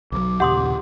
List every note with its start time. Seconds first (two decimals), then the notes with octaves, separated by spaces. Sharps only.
0.12 B1 D#3 F#3 D6
0.40 D#2 A#2 C#3 G4 F#5 C6 D#6